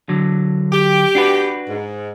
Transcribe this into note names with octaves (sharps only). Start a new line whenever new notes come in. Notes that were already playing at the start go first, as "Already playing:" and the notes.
D3 F#3
G4
D4 F#4 B4
G#2